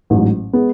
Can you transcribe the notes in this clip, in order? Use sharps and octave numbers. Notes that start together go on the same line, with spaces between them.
A1 G#2 F#3
G#3 B3